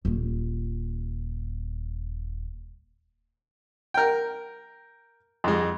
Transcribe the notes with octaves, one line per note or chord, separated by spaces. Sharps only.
D#1 F4
A#4 G5
F2 G#3